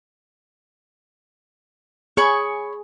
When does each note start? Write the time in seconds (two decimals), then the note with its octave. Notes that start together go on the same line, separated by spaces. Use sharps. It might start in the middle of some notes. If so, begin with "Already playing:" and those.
2.17 G#4 C#5 B5 C#6